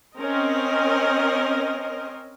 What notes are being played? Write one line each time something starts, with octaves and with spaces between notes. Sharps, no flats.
C4 C#4 A#4 D#5